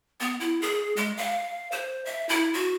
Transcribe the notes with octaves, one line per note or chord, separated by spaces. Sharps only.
B3
E4
G#4
G#3
F5
C5
E5
E4
F#4